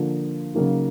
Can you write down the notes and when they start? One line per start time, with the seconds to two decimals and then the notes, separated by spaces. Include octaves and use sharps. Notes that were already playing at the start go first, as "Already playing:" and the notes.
Already playing: D3 F3 A#3
0.55 C#3 F#3 A#3 D#4